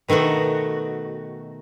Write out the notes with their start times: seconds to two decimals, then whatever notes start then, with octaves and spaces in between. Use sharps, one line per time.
0.08 B2 D#3 A3 B3 F#4